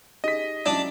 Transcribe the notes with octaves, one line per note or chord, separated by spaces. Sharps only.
D#4 G4 G#4 D#5 B6
F#3 C#4 D4 E4